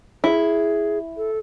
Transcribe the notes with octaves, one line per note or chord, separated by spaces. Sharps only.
E4 G#4
A4